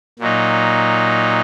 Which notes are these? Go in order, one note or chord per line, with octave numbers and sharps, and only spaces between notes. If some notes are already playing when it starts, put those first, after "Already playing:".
A#2 F#3 D#4